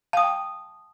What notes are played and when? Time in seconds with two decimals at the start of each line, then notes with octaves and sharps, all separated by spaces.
0.13 F5 G5 A5 D#6